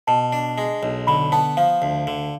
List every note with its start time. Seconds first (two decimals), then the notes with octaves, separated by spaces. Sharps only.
0.07 B2 A5
0.33 D4
0.58 G#3
0.83 B1
1.07 D3 B5
1.32 B3 A5
1.57 F3 F5
1.82 D2
2.07 D3